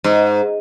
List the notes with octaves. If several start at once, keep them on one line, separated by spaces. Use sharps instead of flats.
G#2